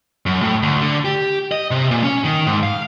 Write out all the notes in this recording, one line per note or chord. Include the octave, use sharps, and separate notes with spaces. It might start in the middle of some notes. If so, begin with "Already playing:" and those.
F#2
A2
D2
D3
G4
D#5
C3
A#2
C#4
D#3
G#2
F5